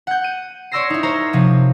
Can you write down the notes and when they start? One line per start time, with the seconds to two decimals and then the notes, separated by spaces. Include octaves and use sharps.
0.07 F#5 G6
0.24 D#7
0.72 C#5 D5 C6 E6 A#6 C7
0.90 D#4 E4
1.03 A#4 C5 C#5 A#5
1.33 C3 F3